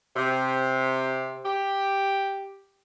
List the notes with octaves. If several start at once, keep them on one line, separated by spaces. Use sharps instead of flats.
C3
G4